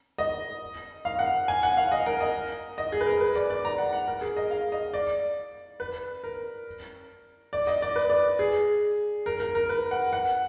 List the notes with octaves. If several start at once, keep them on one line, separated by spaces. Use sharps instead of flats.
D#5
F5
F#5
G#5
F#5
F5
D#5
A#4
D#5
D#5
G#4
B4
A#4
B4
D5
D5
A#5
F#5
F#5
A#4
G#4
D#5
F5
D#5
D5
B4
A#4
D5
D#5
D5
B4
D5
G#4
A#4
A#4
A#4
B4
F#5
F#5